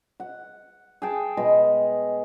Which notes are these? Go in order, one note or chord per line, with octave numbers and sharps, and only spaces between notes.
F#5
G#4 G5 A5
B2 G#3 D#5 B5